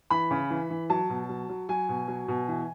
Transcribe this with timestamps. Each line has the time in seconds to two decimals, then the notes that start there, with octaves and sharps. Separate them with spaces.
0.10 E3 B5
0.31 C#3
0.50 E3
0.70 E3
0.90 F#3 A5
1.10 B2
1.29 F#3
1.49 F#3
1.69 F#3 G#5
1.89 B2
2.08 F#3
2.28 B2
2.48 E3